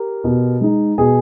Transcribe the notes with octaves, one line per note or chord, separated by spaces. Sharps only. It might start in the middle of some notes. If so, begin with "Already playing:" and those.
Already playing: G4 A#4
B2
G#3 D#4
B2 G#4